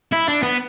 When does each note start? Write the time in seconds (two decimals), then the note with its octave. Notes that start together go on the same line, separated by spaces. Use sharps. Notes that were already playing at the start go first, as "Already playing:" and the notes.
0.12 E4
0.28 D4
0.43 B3